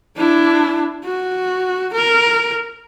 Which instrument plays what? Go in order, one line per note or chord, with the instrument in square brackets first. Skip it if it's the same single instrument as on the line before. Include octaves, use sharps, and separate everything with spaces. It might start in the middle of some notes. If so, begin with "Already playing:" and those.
[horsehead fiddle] D4 E4
F#4
A#4